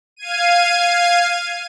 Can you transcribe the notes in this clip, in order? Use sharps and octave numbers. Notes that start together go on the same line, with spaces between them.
F5 G#6 D#7